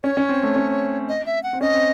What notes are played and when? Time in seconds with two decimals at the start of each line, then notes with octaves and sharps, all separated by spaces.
0.04 C#4 C#5
0.17 C#4
0.29 C4
0.43 A3
0.56 C#4
1.09 D#5
1.26 E5
1.43 F#5
1.53 C4
1.61 C#4 D#5
1.74 C4